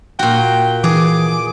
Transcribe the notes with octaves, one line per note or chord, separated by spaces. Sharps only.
A#2 F#4 G5
E3 G#4 D6